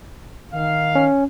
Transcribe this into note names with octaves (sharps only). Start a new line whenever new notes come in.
D#3 F5
C#4